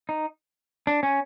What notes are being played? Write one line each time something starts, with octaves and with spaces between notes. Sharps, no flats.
D#4
D4
C#4